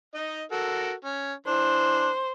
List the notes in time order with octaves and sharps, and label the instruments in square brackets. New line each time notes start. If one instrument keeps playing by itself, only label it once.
[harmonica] D#4 D#5
F#4 A4 A#4
C#4
[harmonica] E3 D4 [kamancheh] C5